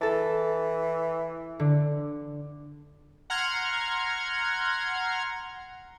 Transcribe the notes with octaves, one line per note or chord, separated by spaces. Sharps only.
E3 A4 A5
D3
F#5 A#5 C6 F6 G#6